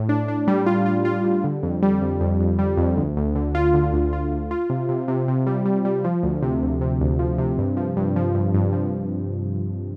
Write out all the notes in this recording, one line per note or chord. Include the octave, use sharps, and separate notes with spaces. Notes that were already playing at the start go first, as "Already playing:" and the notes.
Already playing: A2
D4
D4
G3
F4
F4
F4
G3
D3
F2
G3
F2
F2
F2
G3
F2
D2
D2
D3
F4
D3
D2
F4
D2
F4
C3
C3
C3
C3
G3
G3
G3
F3
D2
C3
D2
C3
D2
F3
C3
G2
F3
G2
F3
G2
G2
F3